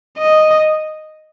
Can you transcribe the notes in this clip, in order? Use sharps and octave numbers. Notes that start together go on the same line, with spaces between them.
D#5